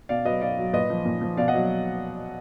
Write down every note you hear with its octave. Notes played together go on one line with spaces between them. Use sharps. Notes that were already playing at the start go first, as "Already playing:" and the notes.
B2 D5 F5
F#3 B4 D#5
B2 D5 F5
F#3
A#2 B4 D#5
F3
A#2
F3
B2 D5 F5
D#5 F#5
F#3